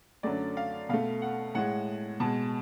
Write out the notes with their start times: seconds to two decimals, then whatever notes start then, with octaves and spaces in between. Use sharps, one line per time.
0.23 F#2 D3 F#3 A3 D5
0.57 F5
0.89 B2 A3 F5
1.22 F#5
1.55 A2 G#3 F#5
2.20 B2 G#3 A5